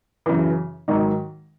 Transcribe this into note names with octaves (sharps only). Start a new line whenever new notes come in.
F#2 C#3 E3
G#2 D#3 F#3 D#4